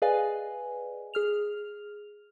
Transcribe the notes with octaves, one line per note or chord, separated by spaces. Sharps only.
G#4 B4 D5 D#5 F5 G#5
G#4 F6 F7